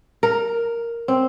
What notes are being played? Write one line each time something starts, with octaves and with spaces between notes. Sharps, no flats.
A#4
C4